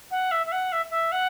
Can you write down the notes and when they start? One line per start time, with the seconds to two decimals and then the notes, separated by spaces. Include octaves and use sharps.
0.11 F#5
0.31 E5
0.46 E5
0.52 F#5
0.72 E5
0.90 E5
1.12 F#5